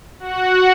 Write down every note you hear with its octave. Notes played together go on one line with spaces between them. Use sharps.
F#4 F#5